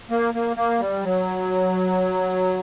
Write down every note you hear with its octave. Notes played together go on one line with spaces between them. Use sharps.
A#3
A#3
A#3
G3
F#3